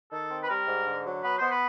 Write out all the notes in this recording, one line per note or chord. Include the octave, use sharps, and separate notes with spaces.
D#3 A4
C4
B4
G3 A#4
G#2
D3
F#3
B3 B4
B3 C5
B4